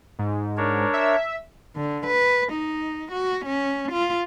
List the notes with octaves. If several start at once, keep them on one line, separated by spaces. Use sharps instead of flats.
G#2
D4 A#4 C#5
E5
D3
B4
D#4
F#4
C#4
F4